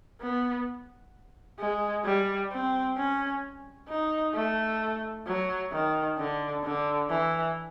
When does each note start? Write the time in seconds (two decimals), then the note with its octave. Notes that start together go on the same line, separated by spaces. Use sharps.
0.21 B3
1.59 G#3
2.05 G3
2.51 C4
2.97 C#4
3.89 D#4
4.34 A3
5.27 F#3
5.72 D#3
6.19 D3
6.64 D3
7.10 E3